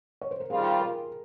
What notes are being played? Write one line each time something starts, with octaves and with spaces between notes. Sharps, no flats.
C#5
C5
A#4
D#3 G3 C4 F4 G#4
A#4